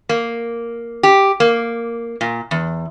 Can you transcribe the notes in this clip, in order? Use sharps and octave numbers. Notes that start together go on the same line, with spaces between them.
A#3
G4
A#3
A#2
E2